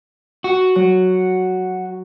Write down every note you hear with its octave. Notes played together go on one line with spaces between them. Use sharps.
F#4
F#3